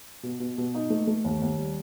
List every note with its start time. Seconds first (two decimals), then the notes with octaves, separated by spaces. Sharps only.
0.23 B2
0.40 B2
0.58 B2
0.75 D#4
0.90 A3
1.07 A3
1.24 D#2
1.42 D#2
1.58 G3